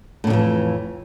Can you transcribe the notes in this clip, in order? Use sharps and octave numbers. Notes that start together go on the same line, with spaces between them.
F2 A2 D3 E3